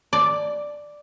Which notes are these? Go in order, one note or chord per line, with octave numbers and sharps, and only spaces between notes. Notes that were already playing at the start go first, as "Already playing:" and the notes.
D5